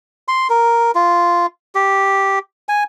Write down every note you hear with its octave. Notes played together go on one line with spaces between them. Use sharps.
C6
A#4
F4
G4
G#5